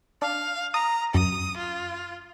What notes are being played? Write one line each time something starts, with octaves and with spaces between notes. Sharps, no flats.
D4 F5
A#5 D#6
F#2 D#6
F4